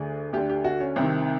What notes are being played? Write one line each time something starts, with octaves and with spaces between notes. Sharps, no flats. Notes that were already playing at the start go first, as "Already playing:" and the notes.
Already playing: D2 D3 G#4
D2 D3 G4
G4
F#4
C#4
C2 C3 D#3 C4